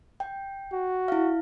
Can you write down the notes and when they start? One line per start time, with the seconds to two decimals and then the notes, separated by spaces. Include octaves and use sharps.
0.20 G5
0.72 F#4
1.08 E4 F5